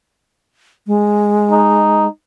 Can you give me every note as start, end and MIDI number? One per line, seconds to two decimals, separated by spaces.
0.87 2.07 56
1.51 2.07 63